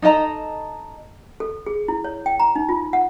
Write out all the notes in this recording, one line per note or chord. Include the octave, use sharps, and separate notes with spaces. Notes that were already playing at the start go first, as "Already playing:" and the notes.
D#4 A4 D#5 A#5
A4
G#4
E4
C#5
G5
A#5
D#4
F4
F#5